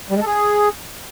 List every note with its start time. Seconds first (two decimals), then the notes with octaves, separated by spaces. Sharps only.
0.10 G3
0.16 G#3
0.21 A4
0.26 G#4